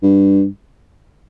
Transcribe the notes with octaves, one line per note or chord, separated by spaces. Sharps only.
G2